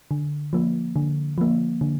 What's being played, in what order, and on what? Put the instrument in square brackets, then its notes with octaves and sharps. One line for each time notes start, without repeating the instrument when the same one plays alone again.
[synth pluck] D3
F3 A#3
D3
F3 A#3
D3